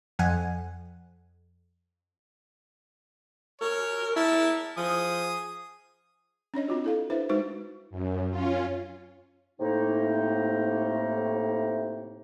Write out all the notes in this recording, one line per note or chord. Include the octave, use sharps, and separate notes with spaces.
F2 F#5 G#5
A#4 C#5
E4 A#4 A5
F3 G#4 D#6
C#4 D4 C#5 D#5
C4 D4 F4 F#4
E4 A4 F5
D4 E4 B4 C5 E5
G#3 D#4 F#4 B4 C5 E5
F#2
C#4 F4
A2 C3 A#3 D#4